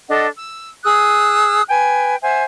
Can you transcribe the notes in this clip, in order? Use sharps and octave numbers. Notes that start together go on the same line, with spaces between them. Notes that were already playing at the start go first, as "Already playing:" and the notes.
D4 A4 D#5 F#5
E6
G#4 D#6 E6 F#6
B4 G5 G#5
C5 E5 F#5 G#5